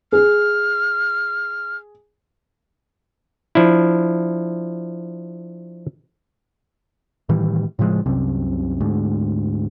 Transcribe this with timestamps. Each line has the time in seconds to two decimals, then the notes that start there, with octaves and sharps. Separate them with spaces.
0.12 G#4 F6
3.55 F3 D4 E4
7.29 A2 D#3 E3 G3
7.79 A2 C#3 F3 G#3
8.06 C2 F#2 C3
8.81 D2 G#2